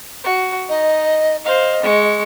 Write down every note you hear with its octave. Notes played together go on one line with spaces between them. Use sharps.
F#4
D#4 D#5
C5 D#5 F5
G#3 C#6